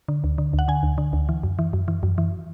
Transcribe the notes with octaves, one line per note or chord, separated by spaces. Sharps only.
D3
D2
D3
D2
F#5
D3 G#5
D2
D3
D2
E3
F#2
E3
F#2
E3
F#2
E3